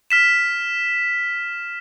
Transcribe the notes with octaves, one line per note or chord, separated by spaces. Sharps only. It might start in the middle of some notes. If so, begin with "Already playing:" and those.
F6 B6 E7